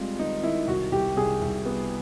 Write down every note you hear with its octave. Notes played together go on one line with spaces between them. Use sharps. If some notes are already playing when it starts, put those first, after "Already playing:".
Already playing: G3 G#3 C4 F4
D#3 D#4
D#3 E4
C2 F#4
C2 G4
C2 G#4
C2
B3